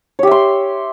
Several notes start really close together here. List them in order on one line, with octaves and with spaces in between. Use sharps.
C#5 G4 E5 C6